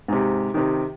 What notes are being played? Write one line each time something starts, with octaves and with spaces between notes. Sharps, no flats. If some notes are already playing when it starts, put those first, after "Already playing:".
G#2 C3
C3 D#3